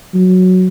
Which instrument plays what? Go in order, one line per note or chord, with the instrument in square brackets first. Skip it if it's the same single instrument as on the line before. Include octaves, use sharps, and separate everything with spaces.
[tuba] F#3